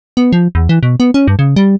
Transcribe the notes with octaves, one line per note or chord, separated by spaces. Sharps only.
B3
F3
E2
E3
B2
B3
C#4
G2
C#3
G3